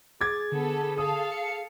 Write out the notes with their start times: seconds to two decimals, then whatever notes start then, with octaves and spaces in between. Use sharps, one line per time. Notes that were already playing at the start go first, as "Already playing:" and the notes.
0.21 G#4 D6 G#6 A6
0.52 D3 B3 A4
0.98 A4 F5 D#6
1.31 C#7